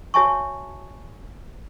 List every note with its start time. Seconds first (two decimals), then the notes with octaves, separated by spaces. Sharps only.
0.14 F#4 C#5 E5 G#5 A5 C#6